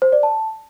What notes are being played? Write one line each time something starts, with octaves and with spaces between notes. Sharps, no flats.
C5
D5
A5